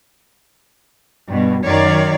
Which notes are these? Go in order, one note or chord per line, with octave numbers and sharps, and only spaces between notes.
G2 B2
F#2 D#3 C#5 D5 F5